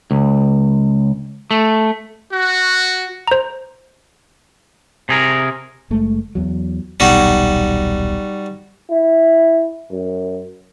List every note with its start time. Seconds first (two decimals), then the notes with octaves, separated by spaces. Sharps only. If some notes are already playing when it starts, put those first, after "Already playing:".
0.11 C#2
1.51 A3
2.33 F#4
3.28 C5 A#5
5.09 C3 G#4 A#4
5.90 F#1 G#3 A3
6.35 E2 F#3
7.00 D#1 B1 B2 G3 D#4 F#4
8.90 E4
9.91 F#2